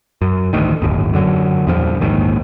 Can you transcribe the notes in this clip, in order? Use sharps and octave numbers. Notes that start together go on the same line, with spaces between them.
F#2
A1 D2 D#3
D1 G1 D#2
F#2 D3 F#3
E2 G2 A#2 F3
A#1 D#2 G#2 D#3